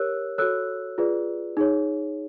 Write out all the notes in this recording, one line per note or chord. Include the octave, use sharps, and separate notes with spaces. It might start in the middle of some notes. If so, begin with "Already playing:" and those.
Already playing: G4 A#4 C#5 E6 F#6
F#4 A4 C#5 E6 F#6
F4 G#4 B4 D5
D#4 G#4 C#5